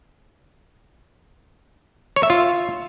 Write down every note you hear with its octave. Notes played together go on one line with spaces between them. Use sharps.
C#5
E5
F4